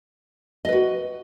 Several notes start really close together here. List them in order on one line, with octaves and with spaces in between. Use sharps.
D#5 B4 F#4